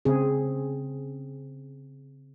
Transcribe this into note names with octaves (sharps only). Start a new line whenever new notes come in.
C#3 C4 G#4